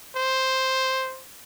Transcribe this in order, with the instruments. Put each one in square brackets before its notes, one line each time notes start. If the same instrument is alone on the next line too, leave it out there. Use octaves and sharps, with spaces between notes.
[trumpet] C5